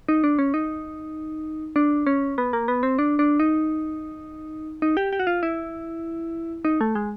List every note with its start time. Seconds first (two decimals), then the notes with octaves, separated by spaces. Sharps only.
0.08 D#4
0.24 D4
0.39 C#4
0.54 D#4
1.76 D4
2.07 C#4
2.38 B3
2.53 A#3
2.68 B3
2.83 C4
2.99 D4
3.19 D4
3.40 D#4
4.82 D#4
4.97 G4
5.13 G4
5.20 F#4
5.27 F4
5.43 E4
6.65 D#4
6.81 A3
6.95 G#3